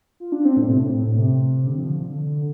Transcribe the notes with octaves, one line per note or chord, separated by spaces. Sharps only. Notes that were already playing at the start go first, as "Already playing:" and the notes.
F4
D4
C4
A2
C3
A2
A2
A2
C3
D3
F3
F3
D3
D3